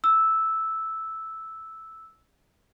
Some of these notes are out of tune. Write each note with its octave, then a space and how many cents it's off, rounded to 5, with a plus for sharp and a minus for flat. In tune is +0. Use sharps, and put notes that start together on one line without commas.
E6 -5